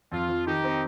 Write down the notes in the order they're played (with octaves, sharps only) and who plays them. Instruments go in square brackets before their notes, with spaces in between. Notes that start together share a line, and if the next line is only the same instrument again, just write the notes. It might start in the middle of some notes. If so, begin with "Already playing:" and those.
[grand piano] F2 [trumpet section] F4
[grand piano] F3
[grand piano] D#3 [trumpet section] D#4 G4
[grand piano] C4